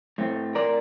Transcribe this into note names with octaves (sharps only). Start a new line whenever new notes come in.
A2 A3 C4
A#4 D5